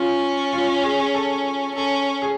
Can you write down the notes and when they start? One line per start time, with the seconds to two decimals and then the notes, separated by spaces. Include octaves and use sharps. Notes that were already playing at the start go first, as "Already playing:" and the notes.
Already playing: C#4 F4
0.53 F4
0.84 G#4
1.00 G#4
1.14 A4
1.75 C#4 A4
2.22 G#4